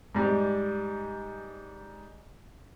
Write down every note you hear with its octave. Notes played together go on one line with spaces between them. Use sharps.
G#2 G3